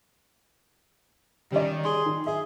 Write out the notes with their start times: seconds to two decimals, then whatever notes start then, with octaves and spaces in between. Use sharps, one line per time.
1.52 D#3 G3 C#4 D#4 D5
1.85 G#4 C6
2.06 D#3
2.26 G#4 E5